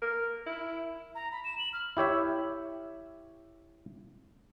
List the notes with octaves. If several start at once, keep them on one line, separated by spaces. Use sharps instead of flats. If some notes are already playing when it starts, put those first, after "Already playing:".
A#4
E4
A#5
B5
E7
F#7
F6
E4 G4 C#5 E5